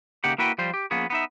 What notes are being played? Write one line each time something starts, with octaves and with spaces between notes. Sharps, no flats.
C#3 A#3 D#4 G4 F#5
A#3 E4 F#4 B4 G5
F3 G3 C5
G4
F3 A#3 B3 C#4 G#4
B3 D#4 E5